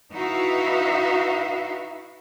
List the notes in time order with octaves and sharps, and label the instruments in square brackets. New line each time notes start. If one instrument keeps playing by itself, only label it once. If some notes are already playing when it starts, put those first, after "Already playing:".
[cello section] D#4 E4 F#4 B4 E5 F5